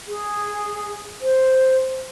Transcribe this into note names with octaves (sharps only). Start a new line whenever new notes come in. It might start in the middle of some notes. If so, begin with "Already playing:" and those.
G#4
C5